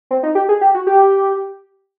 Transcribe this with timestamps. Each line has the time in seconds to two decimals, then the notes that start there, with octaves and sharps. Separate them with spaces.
0.11 C4
0.23 D#4
0.35 G4
0.49 G#4
0.61 G4
0.75 F#4
0.87 G4